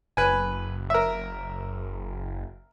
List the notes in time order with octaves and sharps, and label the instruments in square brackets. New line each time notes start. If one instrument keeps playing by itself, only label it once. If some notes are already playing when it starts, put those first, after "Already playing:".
[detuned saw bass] F#1 [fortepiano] B4 G#5
[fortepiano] A#4 E5